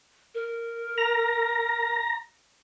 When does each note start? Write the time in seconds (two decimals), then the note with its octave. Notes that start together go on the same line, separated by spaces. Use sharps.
0.35 A#4
0.98 A#5 A#6